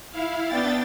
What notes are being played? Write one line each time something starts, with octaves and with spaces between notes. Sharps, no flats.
E4 F5
B3 D4 G5 A6